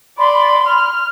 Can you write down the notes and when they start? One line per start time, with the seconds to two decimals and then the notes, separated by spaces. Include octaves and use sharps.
0.18 D5 B5 C6
0.66 F6